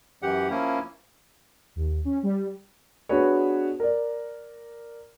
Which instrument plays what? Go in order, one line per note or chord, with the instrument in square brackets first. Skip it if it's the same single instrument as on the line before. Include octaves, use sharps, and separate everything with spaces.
[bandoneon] F#2 E3 G4 F#5
F3 A#3 C#4 E4
[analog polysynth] D#2
C#4
G3
[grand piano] B3 D4 F#4 G#4 B4 C#5
A#4 D5